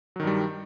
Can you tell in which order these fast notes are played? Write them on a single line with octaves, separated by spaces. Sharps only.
F#3 D#3 G2 G3